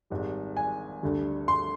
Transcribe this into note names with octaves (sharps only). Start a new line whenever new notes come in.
G#1 G#2 G3
G#5
D2 D3 G3
C6